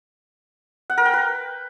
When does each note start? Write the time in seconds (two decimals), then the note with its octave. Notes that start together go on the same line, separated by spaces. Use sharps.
0.90 F#5
0.98 A#4
1.05 G5
1.13 B4